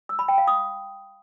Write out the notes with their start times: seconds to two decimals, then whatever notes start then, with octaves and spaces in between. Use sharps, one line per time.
0.09 E6
0.19 B5
0.28 G5
0.38 F5
0.47 D#6